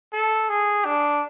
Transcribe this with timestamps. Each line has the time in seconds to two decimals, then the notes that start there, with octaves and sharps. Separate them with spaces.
0.13 A4
0.49 G#4
0.85 D4